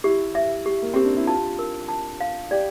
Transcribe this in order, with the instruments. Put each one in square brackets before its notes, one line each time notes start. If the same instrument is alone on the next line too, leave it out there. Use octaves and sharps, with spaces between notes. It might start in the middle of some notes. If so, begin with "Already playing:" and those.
[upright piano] E4 [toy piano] G4
[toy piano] E5
G4
[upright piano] A#3
[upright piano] C4 [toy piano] G4
[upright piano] D4
E4
[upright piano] F4 [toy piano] A5
[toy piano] A#4
A5
F5
[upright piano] G4 [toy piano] D5